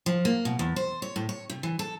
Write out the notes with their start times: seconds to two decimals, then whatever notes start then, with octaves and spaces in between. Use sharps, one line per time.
0.06 F3
0.25 A#3
0.45 B2
0.59 E2
0.76 C5
1.02 C#5
1.16 A2
1.29 C#5
1.50 C3
1.63 E3
1.79 A4